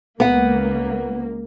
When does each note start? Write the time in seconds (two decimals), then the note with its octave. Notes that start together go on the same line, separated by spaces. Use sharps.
0.20 C#2 A#3 B3 F#5